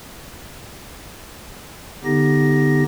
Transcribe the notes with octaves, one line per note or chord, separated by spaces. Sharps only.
D3 B3 D#4 G4 A#6